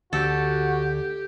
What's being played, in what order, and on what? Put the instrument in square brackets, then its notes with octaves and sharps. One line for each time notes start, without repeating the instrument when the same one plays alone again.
[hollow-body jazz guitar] D2 [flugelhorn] F#4 [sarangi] G4 [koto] A4